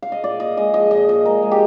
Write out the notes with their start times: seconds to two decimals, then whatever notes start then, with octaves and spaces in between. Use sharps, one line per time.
0.02 F5
0.12 D#5
0.24 A#2 D5
0.40 A#2 D#5
0.57 G#3 D#5
0.74 F3 D#5
0.91 A#2 D#5
1.08 A#2 D#5
1.25 G#3 A#4
1.42 G#3
1.51 G4